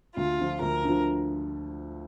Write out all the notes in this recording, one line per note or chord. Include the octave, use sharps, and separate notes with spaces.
D2 F4
D3 F3
D2 A#4
D3 F3